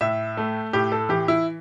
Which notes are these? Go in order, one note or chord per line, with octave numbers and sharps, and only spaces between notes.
A2 E5
A3
A2 G4
A4
E3 G4
E4